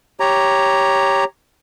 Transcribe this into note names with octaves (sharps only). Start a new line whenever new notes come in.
G4 C#5 A#5